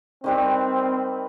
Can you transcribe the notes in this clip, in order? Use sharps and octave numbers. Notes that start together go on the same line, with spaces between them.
D#3 G3 C4 B4